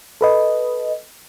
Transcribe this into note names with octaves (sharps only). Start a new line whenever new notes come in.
A4 B4 D#5